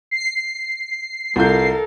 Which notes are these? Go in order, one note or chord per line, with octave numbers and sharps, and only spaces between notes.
C7
C2 F4 A4 A#4 G6